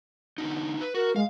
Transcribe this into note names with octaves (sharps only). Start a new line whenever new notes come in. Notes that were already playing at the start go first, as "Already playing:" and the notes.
D3 B3 D#4
B4
F#4 A#4
G#3 F5